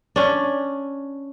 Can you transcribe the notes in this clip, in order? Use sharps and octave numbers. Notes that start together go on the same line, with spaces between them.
C#4 D4